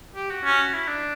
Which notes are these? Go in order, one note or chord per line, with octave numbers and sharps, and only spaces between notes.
G4
F#4
C#4
E4
D4